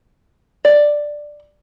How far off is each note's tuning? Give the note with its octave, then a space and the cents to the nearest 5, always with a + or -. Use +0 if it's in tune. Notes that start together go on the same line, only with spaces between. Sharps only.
D5 +5